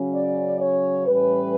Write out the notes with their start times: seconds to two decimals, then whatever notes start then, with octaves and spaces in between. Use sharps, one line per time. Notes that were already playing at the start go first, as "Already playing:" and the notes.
Already playing: C#3 F#3 C#4
0.15 D5
0.61 C#5
1.07 A2 E3 G3 C#4 B4